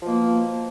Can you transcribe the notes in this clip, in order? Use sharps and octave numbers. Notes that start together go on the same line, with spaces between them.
B2 F3 A#3